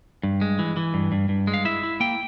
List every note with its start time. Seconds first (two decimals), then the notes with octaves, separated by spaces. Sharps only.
0.23 G2
0.41 G#3
0.59 E3
0.76 E3
0.94 G2
1.12 G2
1.29 G2
1.47 G#3
1.54 F5
1.65 E4 E5
1.83 E4
2.00 A#3 G5